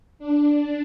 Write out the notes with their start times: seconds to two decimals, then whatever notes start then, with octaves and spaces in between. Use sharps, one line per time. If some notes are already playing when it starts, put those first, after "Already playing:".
0.19 D4